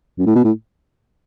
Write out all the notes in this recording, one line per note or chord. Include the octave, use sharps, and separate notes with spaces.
F#2
A2
B2
A2